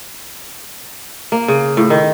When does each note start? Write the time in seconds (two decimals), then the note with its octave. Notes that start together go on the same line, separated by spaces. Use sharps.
1.32 A#3
1.48 C#3
1.77 A2
1.90 D#3